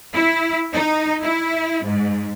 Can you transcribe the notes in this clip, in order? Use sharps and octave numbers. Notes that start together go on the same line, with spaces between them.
E4
D#4
E4
G#2